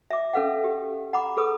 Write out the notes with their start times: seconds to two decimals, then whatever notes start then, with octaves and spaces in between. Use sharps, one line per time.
0.11 E5 D6
0.33 C#4 A4 B4 F5 F#5
0.64 G4
1.13 F#5 A#5 B5 D6
1.37 G#4 A4 B4 D#6